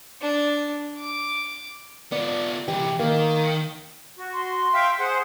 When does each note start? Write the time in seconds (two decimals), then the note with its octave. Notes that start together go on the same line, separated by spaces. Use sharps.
0.21 D4
0.98 D6
2.12 B3 F4 D5
2.68 C2 E3 G4
2.99 D#3 A#3
4.18 F#4
4.33 C6
4.74 E5 F5 G5
4.99 G#4 C5 F#5